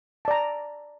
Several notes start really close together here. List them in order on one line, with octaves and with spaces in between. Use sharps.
A5 D5 A#5